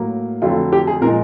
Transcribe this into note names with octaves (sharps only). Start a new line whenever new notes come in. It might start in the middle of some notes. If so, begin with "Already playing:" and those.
Already playing: A2 F#3 A#3
F2 D3 F#3 A3 F4
G4
G#4
A#2 F3 G#3 A#4